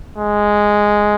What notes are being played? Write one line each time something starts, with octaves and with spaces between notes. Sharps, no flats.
G#3